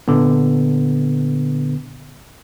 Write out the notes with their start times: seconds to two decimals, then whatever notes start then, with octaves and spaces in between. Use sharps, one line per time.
0.08 A#2 D3 B3